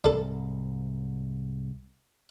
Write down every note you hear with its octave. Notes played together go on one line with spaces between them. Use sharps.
C2 G#2 D4 A4